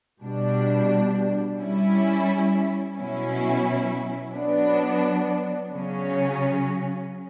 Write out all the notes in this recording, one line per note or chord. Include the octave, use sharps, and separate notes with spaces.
B2 G3 D4
G3 C#4 E4
B2 F#3 C#4 E4
F#3 B3 D4
C#3 F#3 C#4